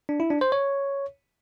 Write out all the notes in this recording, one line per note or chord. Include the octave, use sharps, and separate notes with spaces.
D4
E4
D4
C5
C#5